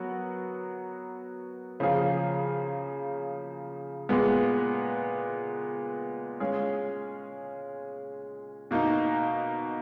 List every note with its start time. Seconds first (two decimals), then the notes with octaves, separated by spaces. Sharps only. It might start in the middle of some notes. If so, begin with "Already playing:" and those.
Already playing: F#3 B3 F#4 A#4
1.80 C#3 F3 A#3 F4 G#4
4.09 A#2 G#3 B3
6.40 G#3 C#4 F4 G#4
8.71 B2 A#3 D#4